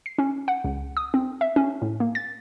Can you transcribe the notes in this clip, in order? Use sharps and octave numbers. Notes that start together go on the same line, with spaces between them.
C7
C#4
F#5
C#2
D#6
C4
E5
C#4
A2
A#3
A6